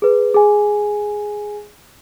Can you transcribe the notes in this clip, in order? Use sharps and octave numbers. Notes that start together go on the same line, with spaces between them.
G#4 B4
G#4 G#5